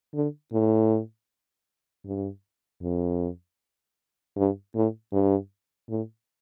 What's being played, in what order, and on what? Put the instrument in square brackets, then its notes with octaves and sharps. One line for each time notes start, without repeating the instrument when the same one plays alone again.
[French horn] D3
A2
G2
F2
G2
A2
G2
A2